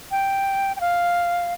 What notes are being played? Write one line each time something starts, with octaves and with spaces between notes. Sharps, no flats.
G5
G5
F5